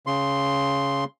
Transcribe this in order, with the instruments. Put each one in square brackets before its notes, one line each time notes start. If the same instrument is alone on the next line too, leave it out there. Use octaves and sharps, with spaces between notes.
[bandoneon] C#3 C6